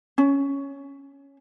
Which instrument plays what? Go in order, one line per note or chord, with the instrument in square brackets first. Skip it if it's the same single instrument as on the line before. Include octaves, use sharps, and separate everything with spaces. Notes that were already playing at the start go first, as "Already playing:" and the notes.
[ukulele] C#4